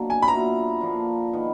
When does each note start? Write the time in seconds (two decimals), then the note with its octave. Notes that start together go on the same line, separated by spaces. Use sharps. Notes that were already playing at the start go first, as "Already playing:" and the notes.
Already playing: B2 F#3 A#3 D4
0.10 G#5
0.22 B5
0.27 A#2 F#3 B3 E4 A#5
0.81 D3 F3 A#3 D4
1.33 D#3 G#3 B3